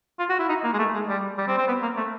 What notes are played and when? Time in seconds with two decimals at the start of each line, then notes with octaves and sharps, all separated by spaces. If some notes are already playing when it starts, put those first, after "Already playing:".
0.19 F4
0.29 F#4
0.39 E4
0.49 D#4
0.64 A#3
0.73 G#3
0.79 A3
0.94 G#3
1.09 G3
1.38 G3
1.48 C4
1.58 C4
1.68 B3
1.82 A#3
1.97 A3